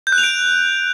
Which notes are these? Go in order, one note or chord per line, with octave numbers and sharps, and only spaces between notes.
G6
F#6
F7
D7